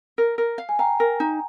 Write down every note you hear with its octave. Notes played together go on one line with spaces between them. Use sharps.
A#4
A#4
F5
G#5
F5 G5 A#5
A#4
D#4